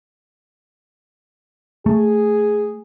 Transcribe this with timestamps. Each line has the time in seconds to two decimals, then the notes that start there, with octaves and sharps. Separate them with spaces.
1.86 A3 G#4